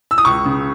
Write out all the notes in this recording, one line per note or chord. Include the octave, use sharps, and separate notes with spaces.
E6
D#6
C#2 C#6
C#3